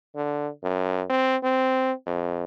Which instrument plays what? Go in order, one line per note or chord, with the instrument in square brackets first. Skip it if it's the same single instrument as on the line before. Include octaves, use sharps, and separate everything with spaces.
[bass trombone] D3
F#2
C4
C4
F2